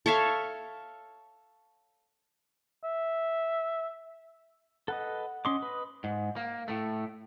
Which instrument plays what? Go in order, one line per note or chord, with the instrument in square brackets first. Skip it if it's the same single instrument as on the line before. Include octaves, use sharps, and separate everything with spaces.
[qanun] A4 C#5 E5 F5
[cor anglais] E5
[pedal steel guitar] A4 B4 D#5 [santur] F#5
[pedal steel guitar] C#4 C6 D6 [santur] D#5
[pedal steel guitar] B4
[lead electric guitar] G#2
A#3
A2 A3